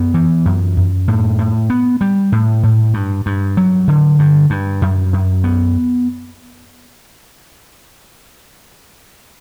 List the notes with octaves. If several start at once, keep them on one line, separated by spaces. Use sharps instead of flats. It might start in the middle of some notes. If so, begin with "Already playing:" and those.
Already playing: F#2 B3
E3
F#2
F#2
A2
A2
B3
G3
A2
A2
G2
G2
F#3
D3
G2
G2
F#2
F#2
B3